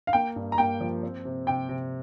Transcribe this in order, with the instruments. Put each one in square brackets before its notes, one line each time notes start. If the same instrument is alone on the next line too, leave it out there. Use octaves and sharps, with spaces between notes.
[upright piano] F5
[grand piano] A#3 [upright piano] G5
[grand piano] G2
[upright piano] A#5
[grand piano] A#3 [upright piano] G5
[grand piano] F3
C4
C3
[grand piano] C3 [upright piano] G5
[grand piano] C3